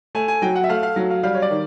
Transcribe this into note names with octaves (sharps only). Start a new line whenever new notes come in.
A3 G#5
G#5
F#3 G5
F#5
E5
A3 F5
F5
F#3
F5
G3 F5
C#5
D5
D#3